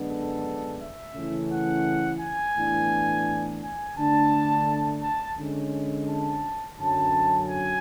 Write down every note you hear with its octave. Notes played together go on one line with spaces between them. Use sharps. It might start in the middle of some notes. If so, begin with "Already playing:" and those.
Already playing: F#2 D3 G#3 B3 D4
A4
E5
C#3 E3 A3 C#4
F#5
G#5
A2 E3 B3 D4
G#5
D3 A3 D4 A5
A5
D3 G#3 C#4
A5
F#2 D3 F#3 C#4 A5
G#5